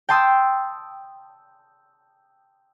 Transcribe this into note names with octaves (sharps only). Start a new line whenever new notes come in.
G5 A5 C6 D#6 E6